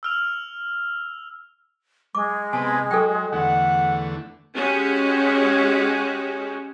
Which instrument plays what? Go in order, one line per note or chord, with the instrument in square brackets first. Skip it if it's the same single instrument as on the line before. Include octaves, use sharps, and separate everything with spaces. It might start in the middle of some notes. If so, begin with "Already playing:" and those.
[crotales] E6 F6 F7
[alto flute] G#3 [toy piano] D6
[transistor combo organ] C3 B3 [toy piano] G#5 A5
[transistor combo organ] F#3 [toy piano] A4 G5
[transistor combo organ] E2 D3 A3 [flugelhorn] F#5
[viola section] G#3 C#4 F#4 G4